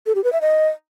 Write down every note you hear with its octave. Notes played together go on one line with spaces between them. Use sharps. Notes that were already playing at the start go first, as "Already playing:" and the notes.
A4
G4
B4
E5
D#5